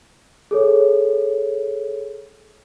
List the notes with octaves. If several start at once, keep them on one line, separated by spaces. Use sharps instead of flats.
G#4 A4 C#5